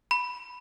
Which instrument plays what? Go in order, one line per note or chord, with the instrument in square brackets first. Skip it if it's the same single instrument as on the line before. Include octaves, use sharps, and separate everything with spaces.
[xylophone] B5